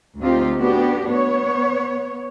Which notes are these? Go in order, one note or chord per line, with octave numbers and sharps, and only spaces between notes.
D2 C4 D#4 F4 G4
A3 B3 D4 F#4 G4
B3 C#5